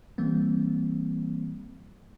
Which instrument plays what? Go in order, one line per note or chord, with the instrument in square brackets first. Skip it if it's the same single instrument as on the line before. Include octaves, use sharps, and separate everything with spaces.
[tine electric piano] E3 G3 A#3 C4